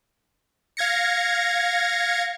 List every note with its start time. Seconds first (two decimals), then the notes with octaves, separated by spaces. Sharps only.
0.77 F5 G#6 A#6 C#7